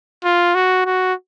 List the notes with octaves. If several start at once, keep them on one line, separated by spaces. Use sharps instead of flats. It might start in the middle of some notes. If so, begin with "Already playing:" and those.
F4
F#4
F#4